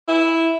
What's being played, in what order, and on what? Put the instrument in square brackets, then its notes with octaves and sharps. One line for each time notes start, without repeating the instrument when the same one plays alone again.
[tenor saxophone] E4